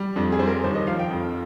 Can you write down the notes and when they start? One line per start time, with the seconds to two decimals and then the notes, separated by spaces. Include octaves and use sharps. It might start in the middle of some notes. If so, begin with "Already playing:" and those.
Already playing: G3
0.16 F2 D4
0.32 G#4
0.39 G3 C5
0.47 A#4
0.64 D#2 C5
0.75 D#5
0.87 F3 F5
0.99 G5
1.11 F2